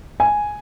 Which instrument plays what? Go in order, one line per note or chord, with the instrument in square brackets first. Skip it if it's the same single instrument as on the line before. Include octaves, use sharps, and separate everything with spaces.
[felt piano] G#5